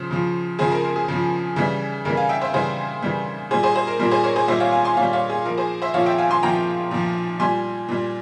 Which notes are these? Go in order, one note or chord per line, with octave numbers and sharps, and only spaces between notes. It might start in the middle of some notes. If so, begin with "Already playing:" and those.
Already playing: C#3 F3 C5
C#3 F3
C#3 F3 G#4 C5
A#4
A#4
G#4
C#3 F3
C#3 E3 G3
C#3 E3 G3 A#4
F5 G#5
E5 G5
C5 E5
C#3 E3 G3 G#4 C5
C#3 E3 G3
A#2 G3 G#4 C5
G#4 C5
G#4 C5
A#4
A#2 G3 A#4
G#4 C5
A#4 C#5
G#4 C5
A#2 G3 C5 E5
C#5 F5
F5 G#5
G#5 C6
A#2 G3 C#5 F5
C#5 F5
G#4
A#2 F3 A#4
G#4 C5
C5 E5
A#2 F3 C#5 F5
E5 G5
F5 G#5
G#5 C6
A#2 F3 G5 A#5
A#2 F3
A#2 G3 G#5 C6
A#2 G3